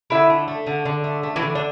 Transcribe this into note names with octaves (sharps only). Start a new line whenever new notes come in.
D3 E4 E5
A3
A3
D3
D3
A3
A3
E3 E4
D3
D4